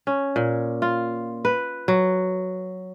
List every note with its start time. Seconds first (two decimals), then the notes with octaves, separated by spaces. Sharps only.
0.07 C#4
0.36 A#2
0.82 F4
1.45 B4
1.88 F#3